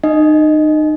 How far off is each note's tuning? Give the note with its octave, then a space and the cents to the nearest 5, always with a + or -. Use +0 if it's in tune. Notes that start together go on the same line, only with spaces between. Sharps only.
D#4 -30 D#5 +0